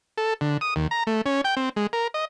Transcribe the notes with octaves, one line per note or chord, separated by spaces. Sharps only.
A4
D3
D#6
D#2
A#5
A3
C#4
G5
C4
G#3
A#4
D#5